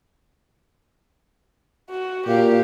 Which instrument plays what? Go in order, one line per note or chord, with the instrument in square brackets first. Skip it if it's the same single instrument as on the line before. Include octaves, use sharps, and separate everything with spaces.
[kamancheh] F#4
[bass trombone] A#2 [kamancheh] G4 F5